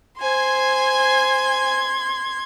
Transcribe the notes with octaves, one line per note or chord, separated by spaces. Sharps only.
C5 G#5 C6 G#6